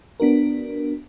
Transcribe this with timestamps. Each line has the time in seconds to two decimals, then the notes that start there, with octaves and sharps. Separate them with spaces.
0.20 B3 D4 F#4 A#4